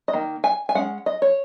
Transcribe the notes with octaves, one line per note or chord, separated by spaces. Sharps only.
D#5
D#3 A#3
G#5
G#5
G#3 C#4 F#5
D#5
C#5